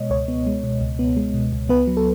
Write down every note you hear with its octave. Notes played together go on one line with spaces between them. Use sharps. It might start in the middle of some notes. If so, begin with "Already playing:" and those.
Already playing: B2 G#3 C#5 D#5
C#2 C#5
B3
G#3
B2
C#2
B3
G#3
B2
C#2
B3 B4
F#3
A4